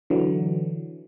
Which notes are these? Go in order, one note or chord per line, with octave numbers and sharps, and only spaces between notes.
D3 E3 F#3